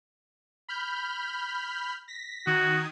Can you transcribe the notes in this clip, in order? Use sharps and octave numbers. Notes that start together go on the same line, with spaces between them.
B5 F6 G6
A#6 B6
D#3 F#4 D#6 G#6